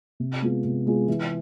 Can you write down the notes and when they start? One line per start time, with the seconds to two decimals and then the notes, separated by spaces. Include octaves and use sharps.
0.20 C3
0.42 G#3 B3 F4
0.65 C3
0.86 G#3 B3 F4
1.08 E3